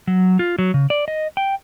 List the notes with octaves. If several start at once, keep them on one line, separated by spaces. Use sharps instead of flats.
F#3
F4
F#3
C#3
D5
D#5
G5